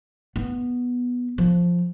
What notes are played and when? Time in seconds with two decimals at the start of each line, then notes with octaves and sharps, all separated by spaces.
0.36 B3
1.38 F3